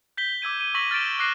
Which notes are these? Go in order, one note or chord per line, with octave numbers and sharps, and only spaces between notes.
G6 B6 G7
D6 E6 G#6 D#7
D#7
C#6 E6 A#6 B6 D#7 F#7
F6 A6 B6 D7 E7
D6 F#6 A#6 C7 D#7 E7